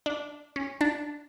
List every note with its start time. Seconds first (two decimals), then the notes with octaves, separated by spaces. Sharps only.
0.06 D4
0.56 C#4
0.81 D4